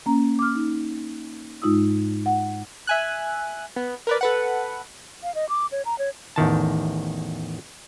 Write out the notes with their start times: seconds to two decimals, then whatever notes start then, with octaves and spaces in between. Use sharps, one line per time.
0.06 A#3 C#4 A#5
0.39 D6 F6
0.55 D#4
1.62 G#2 G#3 D#4 F4 D#6 E6
2.26 F#5
2.87 E5 G#5 F#6
3.76 B3
4.07 A#4 B4 D5
4.21 A4 B4 F#5
5.23 F5
5.35 D#5
5.49 D6
5.72 C#5
5.85 A#5
5.99 C#5
6.36 A1 E2 D#3 A5